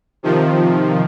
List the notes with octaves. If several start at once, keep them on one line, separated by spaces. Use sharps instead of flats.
C3 D#3 F3